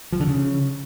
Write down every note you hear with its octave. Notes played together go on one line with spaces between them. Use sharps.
F3
D3
C#3